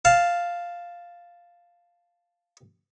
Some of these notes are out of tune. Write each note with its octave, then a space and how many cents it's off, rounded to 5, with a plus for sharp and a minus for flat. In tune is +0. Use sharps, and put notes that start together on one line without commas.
F5 +0 A5 +0